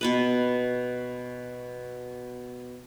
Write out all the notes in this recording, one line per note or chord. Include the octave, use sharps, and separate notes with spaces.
B2 B3 B4